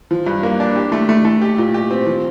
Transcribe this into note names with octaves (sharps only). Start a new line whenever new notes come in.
F3
G2
A#3
D4
G4
A3
A3
A3
G4
A#2
G4
C4
F3